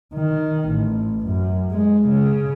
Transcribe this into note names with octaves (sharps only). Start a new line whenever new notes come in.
D#3
A1
F#2
G#3
C#3